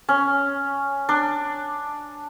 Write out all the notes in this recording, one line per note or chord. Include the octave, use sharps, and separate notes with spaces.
C#4
D4